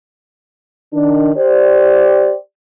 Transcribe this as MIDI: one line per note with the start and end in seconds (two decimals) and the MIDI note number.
0.92 1.31 51
0.92 1.31 62
1.36 2.34 67
1.36 2.34 72
1.36 2.34 74